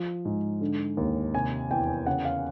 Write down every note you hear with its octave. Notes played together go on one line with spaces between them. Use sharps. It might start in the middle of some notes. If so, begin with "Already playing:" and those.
Already playing: F3
G#2
D3
D#2
C3 G#5
E2 G5
C#3 F#5
F5